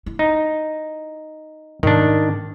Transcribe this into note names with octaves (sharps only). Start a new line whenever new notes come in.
E4
D#4
G#2 D#3 D4